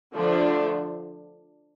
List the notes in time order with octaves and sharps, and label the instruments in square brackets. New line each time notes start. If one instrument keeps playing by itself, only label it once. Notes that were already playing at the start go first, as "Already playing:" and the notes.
[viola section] D3 F3 A3 D4